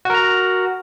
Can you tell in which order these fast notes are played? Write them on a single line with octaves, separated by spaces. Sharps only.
F#4 A#4 A#5